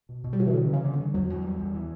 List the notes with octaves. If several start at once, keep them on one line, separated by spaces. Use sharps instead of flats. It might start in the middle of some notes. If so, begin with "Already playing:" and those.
B2
B2
G3
B2 F#3
E3
D3 C#4
C#3 E3
C#4
D3
G2
E2 F#3
E2
G3
E2
E3